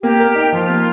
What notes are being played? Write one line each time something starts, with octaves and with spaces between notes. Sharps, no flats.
A#3 G4
A#4
D#4
F3 F4
A#3